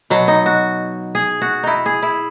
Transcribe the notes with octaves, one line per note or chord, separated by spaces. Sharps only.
B2 F#3
D#4
F#4
G#4
F#4
D#4 E4
G#4
E4